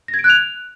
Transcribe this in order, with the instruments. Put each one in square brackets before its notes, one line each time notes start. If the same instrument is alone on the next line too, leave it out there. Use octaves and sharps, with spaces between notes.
[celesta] A#6
G#6
D7
F#6
F7